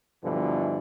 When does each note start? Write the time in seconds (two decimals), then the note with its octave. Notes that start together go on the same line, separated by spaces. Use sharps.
0.23 G2 B2 D3 E3 F3